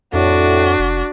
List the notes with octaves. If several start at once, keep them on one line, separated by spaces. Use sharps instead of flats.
F2 A2 D4 F#4
F1